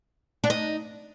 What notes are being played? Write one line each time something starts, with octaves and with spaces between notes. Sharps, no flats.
D4
D#4